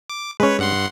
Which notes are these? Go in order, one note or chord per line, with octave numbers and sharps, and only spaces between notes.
D6
G#3 C#4 B4 C#5
G2 F#5 C6